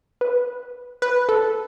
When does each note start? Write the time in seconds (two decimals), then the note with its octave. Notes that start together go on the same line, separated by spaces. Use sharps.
0.21 B4
1.02 B4
1.29 A4